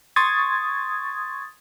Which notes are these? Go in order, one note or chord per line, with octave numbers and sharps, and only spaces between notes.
C6 C#6 D#6 G#6 A6